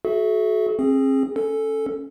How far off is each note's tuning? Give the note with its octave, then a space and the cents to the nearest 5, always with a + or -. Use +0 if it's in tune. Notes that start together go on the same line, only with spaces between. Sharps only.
F#4 +0 A4 -40 E5 +0
C4 +40 G#4 +0
C#4 +0 A4 +0